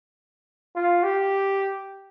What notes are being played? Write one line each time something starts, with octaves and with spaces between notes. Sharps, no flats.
F4
G4